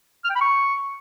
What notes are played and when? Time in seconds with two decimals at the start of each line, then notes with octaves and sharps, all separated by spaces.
0.24 F6
0.30 G5
0.35 B5
0.41 C#6